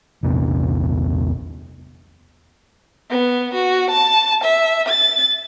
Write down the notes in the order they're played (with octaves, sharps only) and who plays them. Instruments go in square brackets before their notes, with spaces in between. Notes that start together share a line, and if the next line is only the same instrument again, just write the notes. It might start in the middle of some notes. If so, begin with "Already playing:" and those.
[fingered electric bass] A#1 E2 C3 B3
[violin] B3
F#4
A5
E5
A6